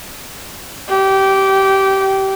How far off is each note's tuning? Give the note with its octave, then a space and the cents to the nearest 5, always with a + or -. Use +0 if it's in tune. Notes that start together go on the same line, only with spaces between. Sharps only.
G4 -20